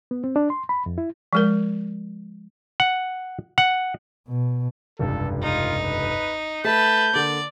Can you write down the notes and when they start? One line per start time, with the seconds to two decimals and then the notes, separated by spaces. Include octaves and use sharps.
0.11 B3
0.24 C4
0.36 D4
0.50 C6
0.69 B5
0.86 F2
0.98 E4
1.33 F3 G#3 A#4
2.80 F#5
3.58 F#5
4.28 B2
4.99 F1 C#2 G2 A4
5.42 D#4 F4
5.83 B4
6.65 A3 B4 E5 A5 G6 B6
7.14 D3 A#3 D5